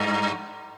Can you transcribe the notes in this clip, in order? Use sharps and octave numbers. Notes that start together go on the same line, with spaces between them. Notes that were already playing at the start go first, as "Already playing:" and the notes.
Already playing: G2